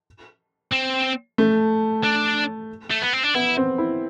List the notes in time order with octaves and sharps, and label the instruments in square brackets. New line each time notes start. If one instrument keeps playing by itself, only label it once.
[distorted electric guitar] C4
[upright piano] A3
[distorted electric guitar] D4
A3
B3
C4
D4
[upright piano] B3 [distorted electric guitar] E4
[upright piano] C4
E4